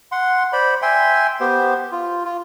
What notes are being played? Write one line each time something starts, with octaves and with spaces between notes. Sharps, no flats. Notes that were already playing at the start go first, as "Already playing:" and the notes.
F#5 C6
C5 D5 B5
E5 G5 G#5 C6
B3 G4 C5
F4
F4